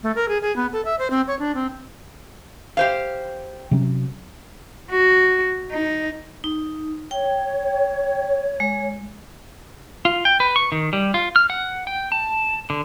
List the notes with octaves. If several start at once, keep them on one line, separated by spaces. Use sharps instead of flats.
A3
A#4
G#4
G#4
B3
A4
E5
C5
C4
C#5
D4
C4
G4 C5 F5
C3 F#3 C#4
F#4
D#4
D#4
C#5 G5
G#3
F4
G5
B4
C#6
D#3
G3
F4
F6
F#5
G5
A5
D3